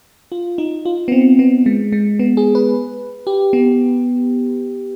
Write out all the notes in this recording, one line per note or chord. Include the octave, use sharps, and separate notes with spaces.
F4
D#4
F4
B3
C4
B3
G#3
G#3
B3
G#4
B4
G4
B3